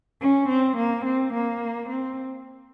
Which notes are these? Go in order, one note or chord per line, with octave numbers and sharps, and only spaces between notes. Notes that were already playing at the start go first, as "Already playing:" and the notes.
C#4
C4
A#3
C4
A#3
C4